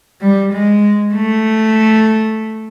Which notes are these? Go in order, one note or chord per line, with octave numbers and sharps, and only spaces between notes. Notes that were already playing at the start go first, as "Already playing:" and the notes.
G3
G#3
A3